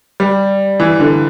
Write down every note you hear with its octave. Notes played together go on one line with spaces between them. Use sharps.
G3
E3
D3